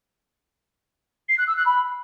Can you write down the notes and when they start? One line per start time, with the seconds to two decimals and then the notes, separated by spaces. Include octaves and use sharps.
1.29 C7
1.38 F#6
1.47 E6
1.56 F#6
1.65 B5